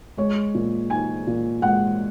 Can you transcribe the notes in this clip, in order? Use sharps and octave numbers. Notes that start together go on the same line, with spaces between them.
G#3 C#5
A#2
D#4 G#5
A#2
G#3 F#5